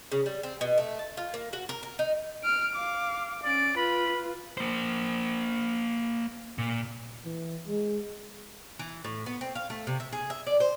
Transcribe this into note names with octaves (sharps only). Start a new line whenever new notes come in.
C#3
G3
C4
B2
A3
A5
F4
A#3
F#4
A#4
A#4
D#4
F6 D7
F5 D6
C#4 D5 D7
F4 B4 B5
A#3 C5
A#2
E3
G#3
E3
A2
B3
C4
F5
A3
C3
E5
G#4
E5
D5
C5